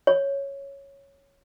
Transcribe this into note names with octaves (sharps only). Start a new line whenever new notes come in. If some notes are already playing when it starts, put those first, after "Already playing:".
C#5